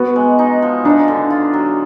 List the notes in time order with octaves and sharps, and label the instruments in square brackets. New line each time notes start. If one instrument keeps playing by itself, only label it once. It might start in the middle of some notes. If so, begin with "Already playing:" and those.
Already playing: [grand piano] B3 [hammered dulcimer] F#4
[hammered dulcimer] G#3
D#4
F3
[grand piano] D4 [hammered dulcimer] D#4
[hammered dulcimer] D3
F4
F#3